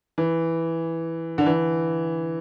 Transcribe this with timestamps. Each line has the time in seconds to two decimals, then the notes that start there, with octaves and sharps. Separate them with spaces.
0.18 E3
1.38 D3
1.46 E3